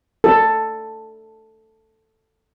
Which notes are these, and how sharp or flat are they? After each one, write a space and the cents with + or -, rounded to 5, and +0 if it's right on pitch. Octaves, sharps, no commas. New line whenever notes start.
A4 +5